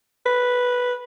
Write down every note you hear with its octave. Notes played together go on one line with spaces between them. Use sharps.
B4